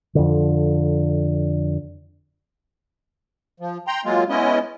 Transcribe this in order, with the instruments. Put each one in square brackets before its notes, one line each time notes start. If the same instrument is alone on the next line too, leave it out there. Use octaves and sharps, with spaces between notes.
[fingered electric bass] F2 D3
[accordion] F3
G5 A#5 C6
F#3 G#3 A#3 F4
G#3 B3 C#4 E4 D#5